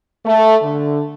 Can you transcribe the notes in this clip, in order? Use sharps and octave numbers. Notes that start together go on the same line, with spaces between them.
A3
D3